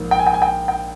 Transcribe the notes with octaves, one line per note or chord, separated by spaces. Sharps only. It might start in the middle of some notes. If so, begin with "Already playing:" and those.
Already playing: A#1 G#2 A#3
G5
G#5
G5
G#5
G5
G5